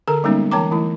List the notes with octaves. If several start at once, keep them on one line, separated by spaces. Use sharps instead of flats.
D3 A4 A#4 A#5
G3 G#3 A#3 B3 C#4 D#4
E3 C#5 G5 A#5 D6
E3 A3 E4